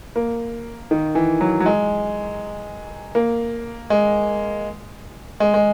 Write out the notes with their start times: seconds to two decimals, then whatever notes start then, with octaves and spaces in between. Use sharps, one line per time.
0.16 A#3
0.91 D#3
1.15 E3
1.41 F#3
1.60 F#3
1.66 G#3
3.15 A#3
3.90 G#3
5.40 G#3
5.54 G#3